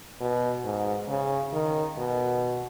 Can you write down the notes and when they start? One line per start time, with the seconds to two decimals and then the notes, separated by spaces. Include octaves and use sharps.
0.20 B2
0.64 G#2
1.09 C#3
1.53 D#3
1.98 B2